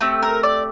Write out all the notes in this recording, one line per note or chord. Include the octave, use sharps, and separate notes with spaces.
A3 C4 G4
A#4
D5